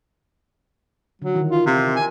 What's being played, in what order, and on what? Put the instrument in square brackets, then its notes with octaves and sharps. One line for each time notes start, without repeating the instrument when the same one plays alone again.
[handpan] D3 [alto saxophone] F#3
[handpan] D#3 E3 E4
[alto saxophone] F4
[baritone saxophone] C3 [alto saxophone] F4
[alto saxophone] G#5